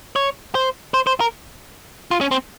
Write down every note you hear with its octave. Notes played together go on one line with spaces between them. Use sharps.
C#5
C5
C5
C5
A#4
F4
C#4
C4